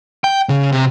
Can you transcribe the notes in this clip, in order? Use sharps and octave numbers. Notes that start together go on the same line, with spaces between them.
G5
C#3
C3